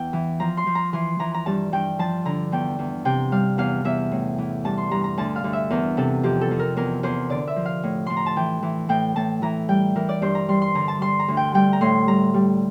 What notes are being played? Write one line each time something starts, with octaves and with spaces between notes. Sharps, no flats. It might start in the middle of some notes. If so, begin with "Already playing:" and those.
Already playing: E2 G5
E3
F3 A#5
C6
F3
A#5
E3 C6
E3 A#5
A#5
G2 A5
G2 G5
F3 A5
D3 A#5
E2 G5
E2
C3 G5
G3 F5
E2 F5
E2 E5
A2
E3
G2 A5
C6
G2 A#5
A#5
D2 A5
F5
D2
E5
E2 A#4
C3 A4
F2 G4
A4
F2
A#4
E2 A#4
E2 C5
D3 D5
E5
F3
F5
A2
A2 C6
A#5
A5
E3 G5
E3
A2 G5
A2 A5
E3 A#5
G3 G5
E3 A#4
D5
G2 C5
A#5
G3 C6
C6
D3 A#5
A5
G3 C6
A#5
D2
G5
G3 G5
A#5
A2 C6
G3 A#5
G3